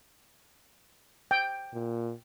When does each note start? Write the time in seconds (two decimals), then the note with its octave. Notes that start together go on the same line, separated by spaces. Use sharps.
1.31 G5
1.73 A#2